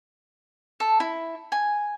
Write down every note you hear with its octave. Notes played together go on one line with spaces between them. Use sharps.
A4
E4
G#5